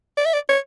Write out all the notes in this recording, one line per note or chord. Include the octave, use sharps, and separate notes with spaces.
D5
E5
D5
C#5